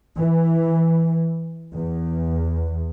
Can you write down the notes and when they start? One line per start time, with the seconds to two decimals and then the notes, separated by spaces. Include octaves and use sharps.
0.17 E3
1.74 E2